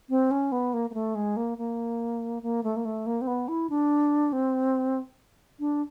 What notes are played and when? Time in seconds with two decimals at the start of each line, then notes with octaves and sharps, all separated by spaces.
0.10 C4
0.31 C#4
0.52 B3
0.74 A#3
0.90 A#3
0.94 A3
1.15 G#3
1.37 A#3
1.58 A#3
2.43 A#3
2.64 A3
2.76 A#3
2.85 A3
3.06 A#3
3.21 C4
3.27 B3
3.48 E4
3.70 D4
4.33 C4
5.60 D4